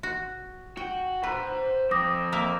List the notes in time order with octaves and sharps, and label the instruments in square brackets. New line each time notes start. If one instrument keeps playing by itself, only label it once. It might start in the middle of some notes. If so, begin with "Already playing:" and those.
[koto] F#4
[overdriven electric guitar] F#4 [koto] G5
[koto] B4 [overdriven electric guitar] C5 A#5
[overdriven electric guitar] F2 C4 [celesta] D6 D#6 A#6
[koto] A#3 A#4 E5